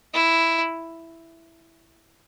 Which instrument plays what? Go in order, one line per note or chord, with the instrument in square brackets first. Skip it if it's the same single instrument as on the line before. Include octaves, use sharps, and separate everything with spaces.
[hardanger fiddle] E4